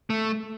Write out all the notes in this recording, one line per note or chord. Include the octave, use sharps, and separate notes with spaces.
A3